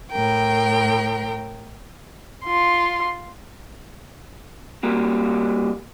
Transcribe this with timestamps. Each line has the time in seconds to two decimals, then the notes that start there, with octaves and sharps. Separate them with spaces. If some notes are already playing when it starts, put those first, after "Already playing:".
0.10 A2 A#4 G5
2.45 F4 C6
4.83 G3 A#3 F#4